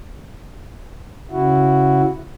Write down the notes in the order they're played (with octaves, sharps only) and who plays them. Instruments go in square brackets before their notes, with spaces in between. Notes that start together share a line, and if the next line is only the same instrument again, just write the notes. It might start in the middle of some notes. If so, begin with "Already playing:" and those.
[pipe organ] C#3 E4 F#4